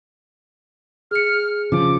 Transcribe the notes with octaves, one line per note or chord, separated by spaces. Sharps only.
G#4 F6 C#7
C#3 F3 D6